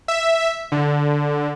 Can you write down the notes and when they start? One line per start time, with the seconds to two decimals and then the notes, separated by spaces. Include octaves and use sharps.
0.08 E5
0.72 D3